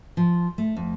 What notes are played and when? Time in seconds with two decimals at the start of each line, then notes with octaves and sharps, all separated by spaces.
0.17 F3
0.58 A3
0.76 F2